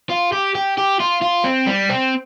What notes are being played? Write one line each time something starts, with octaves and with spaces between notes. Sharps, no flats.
F4
G4
G4
G4
F4
F4
C4
G3
C4